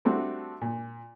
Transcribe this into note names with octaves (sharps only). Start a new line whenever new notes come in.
G3 A3 C4 D4 F#4
A#2